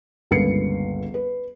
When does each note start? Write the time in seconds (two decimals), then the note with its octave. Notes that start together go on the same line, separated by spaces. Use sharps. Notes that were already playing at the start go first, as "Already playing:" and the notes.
0.31 G1 C#2 A#3 B4 C7 C#7
1.14 B4